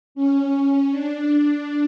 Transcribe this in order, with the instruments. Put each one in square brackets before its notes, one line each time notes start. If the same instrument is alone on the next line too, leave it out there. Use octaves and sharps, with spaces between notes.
[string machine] C#4
D4
D4